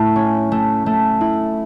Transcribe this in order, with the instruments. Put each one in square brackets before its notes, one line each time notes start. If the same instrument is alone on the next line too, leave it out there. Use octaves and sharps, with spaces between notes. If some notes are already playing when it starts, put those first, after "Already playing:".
Already playing: [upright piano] A2 [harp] A3
[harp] C#4
A3
A3
E4